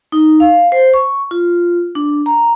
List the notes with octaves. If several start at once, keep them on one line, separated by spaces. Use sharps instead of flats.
D#4
F5
C5
C#6
F4
D4
A#5